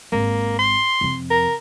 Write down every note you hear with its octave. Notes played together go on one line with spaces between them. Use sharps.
G#1 A#3
C6
F2 C3
A#4